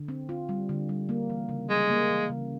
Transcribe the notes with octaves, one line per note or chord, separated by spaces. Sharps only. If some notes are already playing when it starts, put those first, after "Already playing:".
Already playing: D3
C4
F4
G3
D3
G3
A#3
E3
C#3
G3 G#3
A#3
E3
C#3